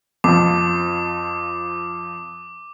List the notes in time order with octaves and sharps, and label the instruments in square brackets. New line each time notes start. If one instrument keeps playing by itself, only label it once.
[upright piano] F2 F3 [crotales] D6